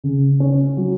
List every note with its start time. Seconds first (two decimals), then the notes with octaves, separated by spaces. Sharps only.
0.04 C#3
0.40 C#4
0.77 F#3